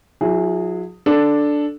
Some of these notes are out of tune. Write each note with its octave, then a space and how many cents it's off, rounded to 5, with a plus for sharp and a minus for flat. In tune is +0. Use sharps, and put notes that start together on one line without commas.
F#3 -40 E4 -5 G#4 +0
D4 +0 A4 +0